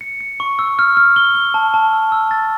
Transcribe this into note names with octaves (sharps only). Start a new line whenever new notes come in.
C#7
C#7
C#6
E6
F6
F6
G7
G7
A5
A5
E6
E6
A6